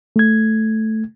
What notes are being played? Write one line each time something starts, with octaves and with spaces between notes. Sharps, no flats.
A3 G#6